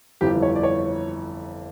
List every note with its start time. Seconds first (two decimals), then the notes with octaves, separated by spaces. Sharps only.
0.21 G1 F2 E3 G4
0.42 C#5
0.56 D5
0.63 C#5